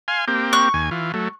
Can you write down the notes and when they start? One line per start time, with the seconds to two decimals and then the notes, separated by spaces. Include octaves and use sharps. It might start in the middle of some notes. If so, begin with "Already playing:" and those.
0.08 F5 G#5 C6
0.28 A#3 C4 G4
0.53 C#6 F#6
0.74 D#2 G#5
0.91 E3 F4
1.14 F#3 A3